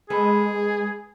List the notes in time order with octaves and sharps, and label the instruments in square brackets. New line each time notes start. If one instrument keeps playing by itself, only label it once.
[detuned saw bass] G#3 [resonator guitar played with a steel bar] B3 A4 B4 [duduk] G#4